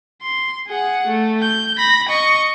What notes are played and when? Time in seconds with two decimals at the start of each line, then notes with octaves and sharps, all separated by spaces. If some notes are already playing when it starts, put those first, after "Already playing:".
0.22 C6
0.68 G#4 F#5
1.07 A3
1.42 G6
1.77 B5 A#6
2.09 D#5 C#6